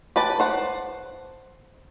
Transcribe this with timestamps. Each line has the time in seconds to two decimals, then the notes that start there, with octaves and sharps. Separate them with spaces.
0.16 G4 B4 A5
0.40 C5 F#5